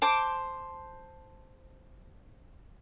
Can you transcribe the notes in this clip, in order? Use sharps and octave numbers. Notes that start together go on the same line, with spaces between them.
C5 A5 D6